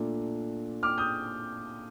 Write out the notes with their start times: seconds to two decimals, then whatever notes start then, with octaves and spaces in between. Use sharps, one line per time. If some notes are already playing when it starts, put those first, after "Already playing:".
Already playing: A#2 A3 D4
0.83 D6 F6
0.98 D#6 G6